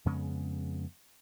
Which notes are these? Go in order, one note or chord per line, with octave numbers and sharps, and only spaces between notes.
F2 C#3 G#3 B3